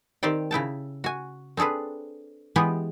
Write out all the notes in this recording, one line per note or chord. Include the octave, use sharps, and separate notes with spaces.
D#3 C4 G4 C5 D5 G5
C#3 E4 G5 A5
F#4 G#5
C4 D4 G#4 A4 B4
E3 G#3 B3 G4 G#5